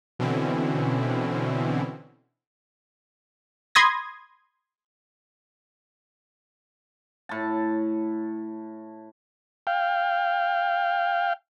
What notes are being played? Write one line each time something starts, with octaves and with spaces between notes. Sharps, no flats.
B2 D3 E3 C4 C#4 E4
B5 C6 D#6 G#6 A#6
A2 A5
F5 G5